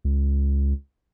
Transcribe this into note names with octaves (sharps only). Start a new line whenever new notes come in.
C#2